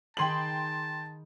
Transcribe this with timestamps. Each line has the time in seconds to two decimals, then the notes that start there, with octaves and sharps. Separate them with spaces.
0.17 D#3 G#4 G5 A5 B5 C6 F#7